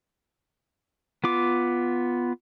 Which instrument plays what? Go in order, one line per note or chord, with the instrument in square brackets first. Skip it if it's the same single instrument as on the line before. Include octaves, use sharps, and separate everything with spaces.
[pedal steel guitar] B3 F4 D6